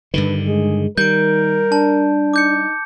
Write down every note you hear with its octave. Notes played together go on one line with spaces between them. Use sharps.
G2 D3 D#3 B4
G#3 G#4
D#3 G3 A#4 G6 D7
D4 A5
D#4 D6 G6 C#7